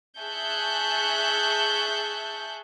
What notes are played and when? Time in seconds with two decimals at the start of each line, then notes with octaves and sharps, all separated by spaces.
0.19 G#4 E5 A5 C#6 F#6 G6